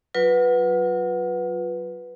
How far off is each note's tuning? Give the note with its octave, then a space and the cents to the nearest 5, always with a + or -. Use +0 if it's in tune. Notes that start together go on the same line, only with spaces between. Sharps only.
F#3 +0 F4 +30 B4 +0